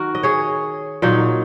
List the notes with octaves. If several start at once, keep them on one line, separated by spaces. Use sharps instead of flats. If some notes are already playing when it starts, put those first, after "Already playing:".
Already playing: D#3 F#4 A#4
D#5
G#4 C#5
A#2 F#3 D#4